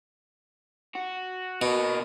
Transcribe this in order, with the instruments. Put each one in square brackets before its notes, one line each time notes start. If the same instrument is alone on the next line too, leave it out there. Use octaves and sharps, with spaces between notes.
[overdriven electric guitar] F#4
[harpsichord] B2 [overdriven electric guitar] A#3 F#4